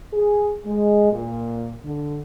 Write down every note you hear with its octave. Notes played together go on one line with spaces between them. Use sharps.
G#4
G#3
A#2
D3